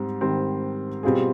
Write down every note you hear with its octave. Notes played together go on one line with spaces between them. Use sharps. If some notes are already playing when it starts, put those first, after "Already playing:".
Already playing: G#2 G3 C4
G#2 D#3 G3 C4
B2 G3 C4 F4 G#4